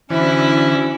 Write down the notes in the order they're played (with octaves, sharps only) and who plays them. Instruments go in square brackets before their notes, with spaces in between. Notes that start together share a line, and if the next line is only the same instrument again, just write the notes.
[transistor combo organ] D3 E3 [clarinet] C#4 [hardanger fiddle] E4 [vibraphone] F#4 C5